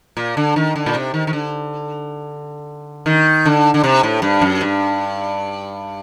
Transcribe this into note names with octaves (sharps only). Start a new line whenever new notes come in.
A#2
D3
D#3
D3
A#2
C3
D#3
D#3
D3
D#3
D3
D3
C3
A2
G2
F#2
G2